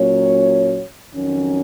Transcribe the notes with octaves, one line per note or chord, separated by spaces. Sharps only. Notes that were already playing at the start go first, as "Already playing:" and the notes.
Already playing: A#2 F#3 C#4 F#4 C#5
F2 D#3 F#3 C#4